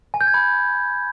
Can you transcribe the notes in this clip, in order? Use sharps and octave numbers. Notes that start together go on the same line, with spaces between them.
G#5
G6
G#6
B5